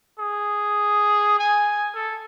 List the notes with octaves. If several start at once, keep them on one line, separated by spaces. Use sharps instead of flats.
G#4
G#5
A4